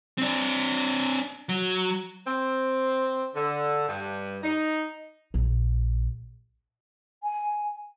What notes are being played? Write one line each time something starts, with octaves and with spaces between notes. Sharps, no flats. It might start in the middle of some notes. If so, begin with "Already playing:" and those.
C4 D4
F#3
C4
D3
G2
D#4
A#1
G#5